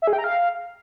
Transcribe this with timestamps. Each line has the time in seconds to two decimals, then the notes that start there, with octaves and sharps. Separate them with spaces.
0.02 E5
0.07 G#4
0.13 G5
0.18 A#5
0.24 F5